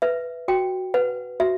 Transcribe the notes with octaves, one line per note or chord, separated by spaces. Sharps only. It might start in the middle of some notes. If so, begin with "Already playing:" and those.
B4 E5
F#4 G5
B4 F#5
F#4 E5